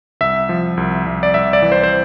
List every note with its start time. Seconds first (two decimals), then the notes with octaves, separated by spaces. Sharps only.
0.21 C2 E5
0.49 F3
0.77 C2
1.06 C2
1.23 D5
1.34 C2 E5
1.53 D5
1.62 E3
1.72 C5
1.83 C5